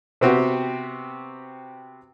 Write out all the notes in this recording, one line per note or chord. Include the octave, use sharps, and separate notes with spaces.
C3 B3 C4 F#4 G4